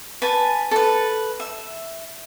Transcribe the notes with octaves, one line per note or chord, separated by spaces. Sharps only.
B4 G#5 A5
A4 B4
E5